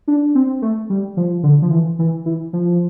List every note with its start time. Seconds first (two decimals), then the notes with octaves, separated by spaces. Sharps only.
0.07 D4
0.35 C4
0.62 A3
0.90 G3
1.17 F3
1.43 D3
1.62 F3
1.71 E3
1.99 E3
2.26 E3
2.53 F3